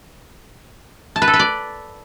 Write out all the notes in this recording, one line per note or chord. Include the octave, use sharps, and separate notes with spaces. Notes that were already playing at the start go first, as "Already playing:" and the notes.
A5
B4
A4
B4
D5